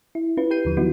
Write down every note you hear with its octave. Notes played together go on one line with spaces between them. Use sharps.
E4
C#4 E4 F4 B4
G4 B4 G6 C7 D#7
D#2 D3 F3
D#3 F#3 B3 D#4 E4 F#4